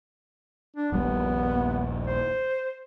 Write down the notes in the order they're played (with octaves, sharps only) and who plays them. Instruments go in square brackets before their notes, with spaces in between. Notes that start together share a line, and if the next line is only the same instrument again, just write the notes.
[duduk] D4
[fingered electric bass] D#1 A#1 G3 [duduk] B3
[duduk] C5